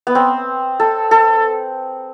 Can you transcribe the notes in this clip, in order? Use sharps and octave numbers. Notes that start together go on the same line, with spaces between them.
B3
C4
A4
A4